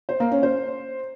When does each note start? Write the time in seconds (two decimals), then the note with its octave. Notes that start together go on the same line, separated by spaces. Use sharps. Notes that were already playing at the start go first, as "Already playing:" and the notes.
0.09 C5
0.20 A#3
0.31 C#4
0.43 C5